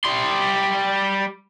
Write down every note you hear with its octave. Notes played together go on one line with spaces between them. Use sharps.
G3 C6